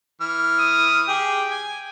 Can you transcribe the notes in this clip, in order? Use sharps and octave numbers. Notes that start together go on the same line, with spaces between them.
E3 F6
D#6
G4 G#4 G5
G#5